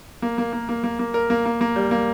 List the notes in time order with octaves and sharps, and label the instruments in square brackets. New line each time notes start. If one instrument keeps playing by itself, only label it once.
[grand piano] A#3
A#3
A#3
A#3
A#3
A#3
A#4
A#3
A#3
A#3
G3
A#3